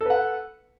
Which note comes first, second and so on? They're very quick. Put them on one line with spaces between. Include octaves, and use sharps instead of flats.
A4 B4 F#5